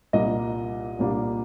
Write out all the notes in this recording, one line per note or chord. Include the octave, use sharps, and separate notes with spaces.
C2 A#2 G3 A#3 D4 D#5
C2 A#2 G3 A#3 D4